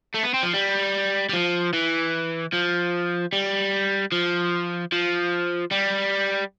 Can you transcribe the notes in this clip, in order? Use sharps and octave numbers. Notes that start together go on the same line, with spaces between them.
A3
B3
C4
F3
G3
G3
F3
E3
F3
G3
F3
F3
G3